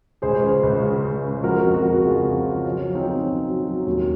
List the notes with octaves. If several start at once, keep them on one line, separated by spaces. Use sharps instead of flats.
C#2 G#4 C5
C#3
C#2
C#3
C#2
C#2
F3 F#4 A#4
F2
F#4 A#4
C#3
F2 F4 G#4
C#3
F3
F#3 C#4 F4
F#3
C4 D#4
F#3
F#3 C#4
F#3
F#3
D#2 C#4